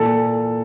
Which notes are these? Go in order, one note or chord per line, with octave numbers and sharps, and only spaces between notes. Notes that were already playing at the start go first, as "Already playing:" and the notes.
Already playing: A#2 E3 A4